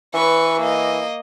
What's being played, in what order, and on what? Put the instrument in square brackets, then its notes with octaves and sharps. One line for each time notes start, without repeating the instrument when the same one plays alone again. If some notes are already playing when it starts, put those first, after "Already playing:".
[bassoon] E3 [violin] B4 C#6
[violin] A#3 D#5